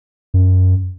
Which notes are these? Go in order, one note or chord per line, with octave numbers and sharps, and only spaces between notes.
F#2